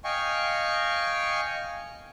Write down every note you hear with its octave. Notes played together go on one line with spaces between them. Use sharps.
D#5 F5 G5 G#5 C#6